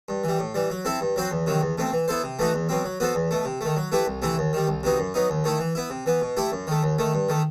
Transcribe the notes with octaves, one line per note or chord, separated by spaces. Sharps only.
G2
E3 G3
A2
E3 G3
F#3
C4 E4 A4
G2
F#3 C4 F#4 C5
E2
C3 D#3 F#3
E2
B2 A3 C4
E3
B3 E4 A4 C5
C3
E3 A3 D#4 F#4
E2
B2 F#3 C4
F#3
B3 F#4 A4 C5
E2
B2 A3
C3
D#3 A3
F#3
A3 E4 G4 B4
C2
C3 E3 A3 E4
D#2
D#3 G3
C2
C3 F#3 B3 D#4
F#2
F#3 B3 D#4
D#2
D#3 A3 E4
E3
B3 E4
C3
E3 B3
B2
A3 E4 G4
F#2
D#3 A3
D#2
D#3 A3
G2
D#3 A3